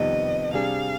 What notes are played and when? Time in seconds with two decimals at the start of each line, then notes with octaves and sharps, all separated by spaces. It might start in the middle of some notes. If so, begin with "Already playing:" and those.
Already playing: F2 C3 D#3 G3 B3 D#5
0.53 C3 G3 D4 G#4 F5